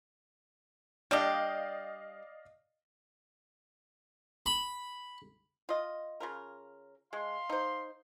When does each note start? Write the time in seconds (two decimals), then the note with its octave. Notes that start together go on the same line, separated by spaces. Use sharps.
1.11 G3 D4 G4 D5 D#5 F5
4.46 B5
5.69 F4 D#5
6.20 C#3 F4 A#4
7.13 G#3 F5 C6
7.50 D#4 C5